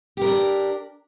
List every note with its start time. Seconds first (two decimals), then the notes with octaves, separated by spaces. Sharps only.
0.17 G4
0.21 A#4
0.26 D4